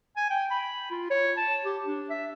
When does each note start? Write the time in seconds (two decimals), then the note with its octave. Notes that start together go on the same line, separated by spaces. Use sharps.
0.17 G#5
0.30 G5
0.51 B5
0.91 F4
1.10 C#5
1.37 A5
1.65 G4
1.85 D4
2.10 E5